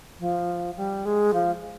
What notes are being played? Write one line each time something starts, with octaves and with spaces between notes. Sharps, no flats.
F3
G3
G#3
F3